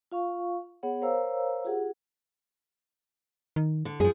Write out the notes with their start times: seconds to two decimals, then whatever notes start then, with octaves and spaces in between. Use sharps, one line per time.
0.12 F4 F5 C#6
0.83 B3 G#4 C#5 F#5
1.02 A#4 C5 C#5 F5 A#5 E6
1.65 F4 G4 G#4 F#5
3.56 D#3
3.85 D3
4.00 F#2 F3 G#4